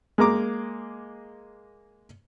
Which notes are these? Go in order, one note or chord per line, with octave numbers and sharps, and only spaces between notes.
G#3 A#3 A#5 D6